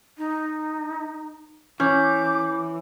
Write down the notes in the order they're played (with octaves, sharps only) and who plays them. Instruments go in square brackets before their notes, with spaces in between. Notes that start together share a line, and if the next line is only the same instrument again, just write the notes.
[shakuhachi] D#4
[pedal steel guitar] E3 [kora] C#4 [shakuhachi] D6 [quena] G6